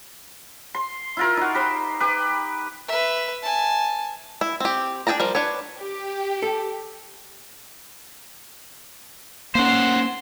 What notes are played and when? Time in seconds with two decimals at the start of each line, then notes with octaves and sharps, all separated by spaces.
0.75 C6
1.17 E4 F4 A#4
1.37 D#4 F#4
1.55 G4 C5 B5
2.00 G4 B4
2.88 B4 E5
3.43 G#5 A5
4.41 E4
4.60 C4 G4
5.07 D4 G#4 G5 A5 A#5
5.20 F3 G3 A#4
5.35 D4 B4 C#5
5.79 G4
6.42 A4
9.55 A#3 C#4 C5 F#5 C6